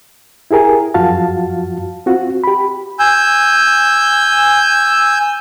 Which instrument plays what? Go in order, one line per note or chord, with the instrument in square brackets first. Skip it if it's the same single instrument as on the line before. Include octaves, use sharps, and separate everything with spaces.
[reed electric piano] E4 G4 G#4 A#4 G#5
F#2 F3 F4 F#4 F5 A5
C4 F4 F#4
G4 B5
[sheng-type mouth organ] G#5 E6 G6